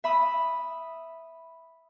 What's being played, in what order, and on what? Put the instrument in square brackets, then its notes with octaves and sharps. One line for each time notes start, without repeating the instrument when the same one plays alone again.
[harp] E5 B5 D#6